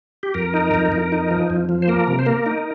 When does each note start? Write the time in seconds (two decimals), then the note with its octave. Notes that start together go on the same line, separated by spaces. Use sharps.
0.23 G4
0.34 F2 A#4
0.54 D#4
0.74 F2
0.92 F2
1.12 D#4
1.31 F3
1.50 F2
1.69 F3
1.82 C5
1.88 A#3 A#4
2.07 C3
2.19 C5
2.26 A#3 A#4
2.46 D#4